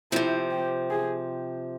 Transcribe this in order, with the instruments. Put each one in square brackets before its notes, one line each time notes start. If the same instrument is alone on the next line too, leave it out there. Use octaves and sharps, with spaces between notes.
[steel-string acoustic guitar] C3 F3 C4 [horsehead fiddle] E4
[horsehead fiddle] G4
G#4